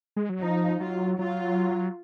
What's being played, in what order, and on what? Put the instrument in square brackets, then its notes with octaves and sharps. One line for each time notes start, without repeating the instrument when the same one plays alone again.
[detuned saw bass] G#3
F#3
[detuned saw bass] F3 [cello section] D#4
[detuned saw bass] F#3 [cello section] F4
[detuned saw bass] F#3 [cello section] F4